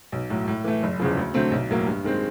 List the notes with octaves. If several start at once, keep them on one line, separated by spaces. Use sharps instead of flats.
B1
A2 F#3
A2
E3 A3
F#1
E2 C#3 F3
D2
D3 F#3 A3 C4
B1
A2 F#3 A#3
G2
D#3 G#3 C4